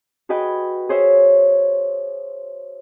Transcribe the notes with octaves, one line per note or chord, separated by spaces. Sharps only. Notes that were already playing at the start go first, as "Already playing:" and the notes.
F#4 G#4 B4 D#5 G5 B5
G#4 C5 C#5 E5